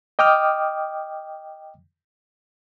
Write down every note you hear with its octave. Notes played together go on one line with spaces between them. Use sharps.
D#5 G5 D6 D#6 F6